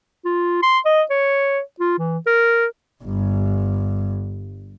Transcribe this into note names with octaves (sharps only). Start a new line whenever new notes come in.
F4
C6
D#5
C#5
F4
E3
A#4
G1 G2